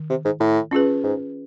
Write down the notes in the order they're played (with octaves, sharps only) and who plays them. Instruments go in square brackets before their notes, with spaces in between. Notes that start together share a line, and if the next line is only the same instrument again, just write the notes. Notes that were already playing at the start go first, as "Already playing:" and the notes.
Already playing: [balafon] D#3
[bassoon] C3
G#2
A2
[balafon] C#4 F4 G#4 B4
[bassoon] G#2